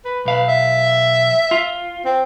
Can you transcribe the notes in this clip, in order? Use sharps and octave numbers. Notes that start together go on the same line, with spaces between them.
B4
B1 B4 F5
E5
F4
C4